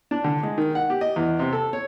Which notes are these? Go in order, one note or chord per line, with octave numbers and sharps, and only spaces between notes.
D4
D3
G#3
D#3
F#5
G4
D#5
E2
C3
A4
C#5